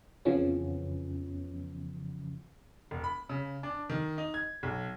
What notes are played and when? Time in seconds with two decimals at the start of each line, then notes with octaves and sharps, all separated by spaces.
0.25 F2 C#3 E3 F3 B3 C#4
2.91 E1
3.04 B5
3.29 C#3
3.63 D4
3.90 D#3
4.18 D#4
4.34 G#6
4.63 B1